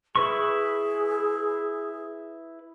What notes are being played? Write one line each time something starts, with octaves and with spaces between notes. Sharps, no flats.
E4 G#4 B4 C#6